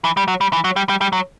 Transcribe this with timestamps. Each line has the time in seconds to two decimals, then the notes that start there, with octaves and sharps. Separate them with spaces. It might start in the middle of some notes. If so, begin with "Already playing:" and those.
0.04 E3
0.17 G3
0.28 F#3
0.41 G3
0.53 E3
0.64 F#3
0.76 G3
0.89 G3
1.01 G3
1.13 F#3